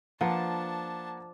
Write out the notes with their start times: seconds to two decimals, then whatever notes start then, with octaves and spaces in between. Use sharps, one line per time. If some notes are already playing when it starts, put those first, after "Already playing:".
0.21 F3 A#3 D4 B4 F#5 A5